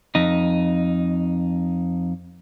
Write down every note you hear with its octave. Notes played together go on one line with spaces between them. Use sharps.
F2 D#4